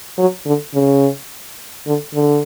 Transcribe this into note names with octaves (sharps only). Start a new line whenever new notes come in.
F#3
D3
C#3
D3
D3